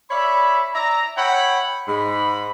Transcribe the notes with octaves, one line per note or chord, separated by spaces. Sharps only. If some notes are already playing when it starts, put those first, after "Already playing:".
C#5 D5 E5 B5
D5 E5 A#5
C#5 E5 F#5 G5 B5
G#2 B5